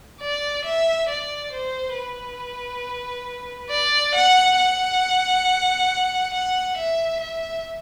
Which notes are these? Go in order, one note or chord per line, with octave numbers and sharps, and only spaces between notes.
D5
E5
D5
C5
B4
D5
F#5
F#5
F#5
E5
E5